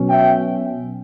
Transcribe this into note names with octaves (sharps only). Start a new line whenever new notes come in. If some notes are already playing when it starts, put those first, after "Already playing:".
Already playing: B2 F#3 C#4
E5 G5